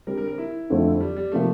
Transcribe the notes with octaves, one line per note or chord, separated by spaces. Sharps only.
D3 G3 C4 A#4
A#4
A#4
E4
F2 D3 F3 A3 C4
G3
G3
C3 F3 A3 A#3